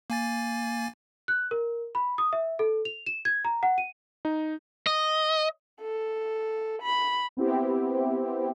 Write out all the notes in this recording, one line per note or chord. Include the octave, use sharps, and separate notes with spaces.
A#3 G#5 A6
F#6
A#4
B5
D#6
E5
A4
F7
E7
G#6
A#5
F#5
D#7
D#4
D#5
A4
B5
B3 C4 E4 G4